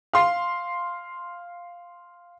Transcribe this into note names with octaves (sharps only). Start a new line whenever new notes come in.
F5 C6